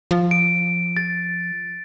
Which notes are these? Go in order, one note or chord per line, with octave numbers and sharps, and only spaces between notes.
F3
D7
A6